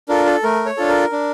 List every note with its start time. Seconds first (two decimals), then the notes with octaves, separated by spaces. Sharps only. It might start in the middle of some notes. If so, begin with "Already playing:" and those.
0.09 D4 F4 A4 A#4
0.26 A4
0.43 A3 A#4
0.66 C#5
0.77 D4 F4 A4
0.88 A#4
1.12 D4